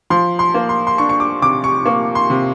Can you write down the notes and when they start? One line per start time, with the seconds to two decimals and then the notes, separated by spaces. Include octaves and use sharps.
0.10 F3 C6
0.39 C6
0.54 A#3
0.69 C6
0.87 C6
0.98 D4 C#6
1.09 C#6
1.20 D6
1.42 C3 D6
1.64 C#6
1.86 A#3 C#6
2.15 C6
2.30 C3